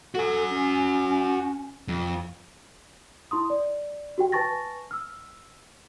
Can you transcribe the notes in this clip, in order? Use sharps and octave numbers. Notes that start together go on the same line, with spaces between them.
F#4 A4 G#5
C#4
F2
E4 C6 D#6
D5
F#4 G4 G5
B4 G#5 A5 C#6 A6 A#6
E6 F6